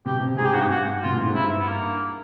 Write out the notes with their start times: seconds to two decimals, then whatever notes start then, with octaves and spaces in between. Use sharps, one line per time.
0.06 B2 G4
0.21 C3
0.38 G#2 G#4
0.45 G4
0.54 G2 F#4
0.61 G4
0.71 G2 F#4
1.03 B2 F4
1.13 A#2
1.20 A2
1.28 G#2
1.35 G2 E4
1.59 B3
1.68 A#3